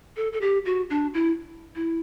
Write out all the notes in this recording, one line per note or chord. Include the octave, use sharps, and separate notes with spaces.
A4
A4
G4
F#4
D4
E4
E4